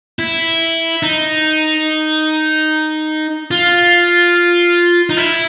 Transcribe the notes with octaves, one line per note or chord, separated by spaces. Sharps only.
E4
D#4
F4
D#4
E4